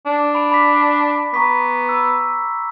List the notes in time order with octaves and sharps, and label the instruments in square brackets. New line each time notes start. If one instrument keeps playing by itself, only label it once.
[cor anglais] D4
[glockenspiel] B5 D7
B5 D6 B6
[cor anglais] B3 [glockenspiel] A#5 C#6 B6
[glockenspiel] E6